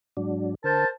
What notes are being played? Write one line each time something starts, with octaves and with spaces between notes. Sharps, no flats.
G#2 F#3 D4
D3 A#4 C5 A5